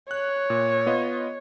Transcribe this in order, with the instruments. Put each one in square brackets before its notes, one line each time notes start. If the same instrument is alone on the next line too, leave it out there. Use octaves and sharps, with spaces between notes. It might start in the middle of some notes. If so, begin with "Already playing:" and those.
[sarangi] C#5 [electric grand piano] F#6
[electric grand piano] A#2
B3 F4 D#5